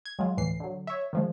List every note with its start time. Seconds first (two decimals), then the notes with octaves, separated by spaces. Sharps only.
0.06 G#6
0.19 F#3 G#3 F4
0.37 D2 A2 E3 C7
0.60 D3 F#3
0.87 C#5 E5
1.13 D#3 F3 G#3